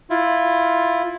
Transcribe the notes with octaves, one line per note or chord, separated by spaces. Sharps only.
E4 F4